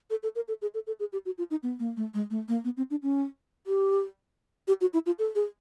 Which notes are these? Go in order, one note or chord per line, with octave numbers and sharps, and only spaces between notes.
A4
A4
A#4
A4
G#4
A4
A4
G#4
G4
F#4
F4
D#4
B3
A#3
A3
G#3
A3
A#3
B3
C4
D4
C#4
G4
G4
F#4
E4
F4
A4
G#4